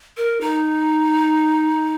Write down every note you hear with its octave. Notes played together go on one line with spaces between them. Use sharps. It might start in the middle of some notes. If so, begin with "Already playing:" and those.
A#4
D#4